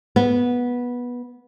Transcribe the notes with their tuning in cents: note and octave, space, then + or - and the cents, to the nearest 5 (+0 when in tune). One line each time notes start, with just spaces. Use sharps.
B3 -15